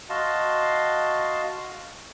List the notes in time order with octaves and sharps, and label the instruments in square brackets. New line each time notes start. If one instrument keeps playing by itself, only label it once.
[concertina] F#4 D#5 F5 A5 C6